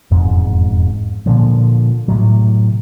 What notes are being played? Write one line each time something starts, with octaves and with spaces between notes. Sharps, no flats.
E1 F2 G#2
A#2 D3 F3
A2 C3 F#3